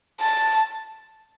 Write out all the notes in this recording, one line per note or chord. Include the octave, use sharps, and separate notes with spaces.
A5